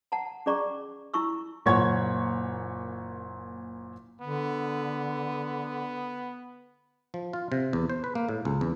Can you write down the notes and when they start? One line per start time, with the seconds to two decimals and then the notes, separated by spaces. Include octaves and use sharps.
0.12 F#5 A5 A#5
0.46 C#4 G#4 D5 A#5 C#6 D6
1.14 E4 A#5 C#6 E6
1.66 F#1 A#2 C#5 F#5 C#6 G#6
4.21 D3 B3
7.14 F3
7.33 F4
7.52 C3
7.73 E2
7.90 C5
8.04 B4
8.15 A#3
8.29 A2
8.45 C#2
8.61 E2